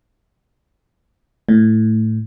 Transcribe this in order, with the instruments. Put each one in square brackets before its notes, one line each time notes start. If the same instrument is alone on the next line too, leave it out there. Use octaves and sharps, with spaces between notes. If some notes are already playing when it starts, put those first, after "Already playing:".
[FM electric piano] A2